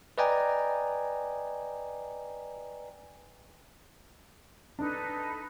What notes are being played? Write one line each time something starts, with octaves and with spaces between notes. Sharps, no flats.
B4 D5 D#5 G5 G#5 A#5
D4 D#4 A4 B4